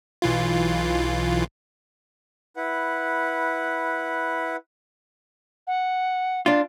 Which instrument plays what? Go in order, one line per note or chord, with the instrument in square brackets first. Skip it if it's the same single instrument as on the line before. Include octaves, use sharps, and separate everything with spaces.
[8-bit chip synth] B1 E3 F4
[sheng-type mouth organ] E4 B4 F#5
[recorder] F#5
[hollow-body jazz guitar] D4 F4